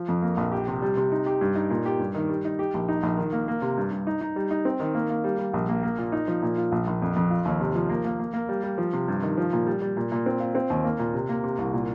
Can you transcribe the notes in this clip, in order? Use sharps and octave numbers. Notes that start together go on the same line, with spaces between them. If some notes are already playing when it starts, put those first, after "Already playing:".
Already playing: F3
F2
A#3
A#1
G4
C3
G3
C3
D#4
G4
G2
D#4
A#2
G4
G2
D#3
G3
D#4
G4
A#1
D#4
A#1
D#3
A#3
A#3
C3
G2
G2
D#4
D#4
G3
D#4
C4
D#3
A#3
A#3
G3
G3
A#1
A#3
A#3
A#2
D#4
F3
A#2
F4
A#1
A#1
F2
F2
F4
D#2
C3
F3
A#3
A#3
A#3
A#3
G3
G3
F3
C3
G2
D#3
F3
A#2
G3
G3
A#2
A#2
C4
F4
C4
D#2
A#3
A#2
C3
A#3
C3
C2
A#2